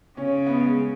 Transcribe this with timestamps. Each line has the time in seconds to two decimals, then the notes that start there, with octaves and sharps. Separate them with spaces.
0.17 C#3 C#4
0.46 B3
0.65 G#3